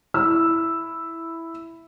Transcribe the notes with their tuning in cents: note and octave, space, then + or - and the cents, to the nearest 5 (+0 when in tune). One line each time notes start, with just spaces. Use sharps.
E4 +0 E6 +0